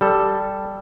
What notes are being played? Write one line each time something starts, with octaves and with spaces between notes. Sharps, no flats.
G3 A4